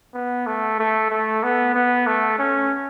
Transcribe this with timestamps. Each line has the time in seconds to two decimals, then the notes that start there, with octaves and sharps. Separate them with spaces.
0.14 B3
0.47 A3
0.79 A3
1.10 A3
1.43 B3
1.75 B3
2.07 A3
2.39 C#4